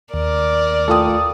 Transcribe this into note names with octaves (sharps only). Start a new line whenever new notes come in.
D#2 A#4 D5
A3 F4 A4 G5 D#6